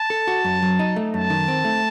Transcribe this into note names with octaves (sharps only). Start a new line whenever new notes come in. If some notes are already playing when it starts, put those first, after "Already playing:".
Already playing: A5
A4
F#4
F#2
F#3
D#4
A3
F#2 A5
D#3
C4
A3